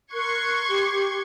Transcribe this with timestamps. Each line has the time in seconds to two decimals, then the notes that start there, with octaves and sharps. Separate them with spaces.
0.13 A#4 C6 C#6 F#6 G#6
0.67 G4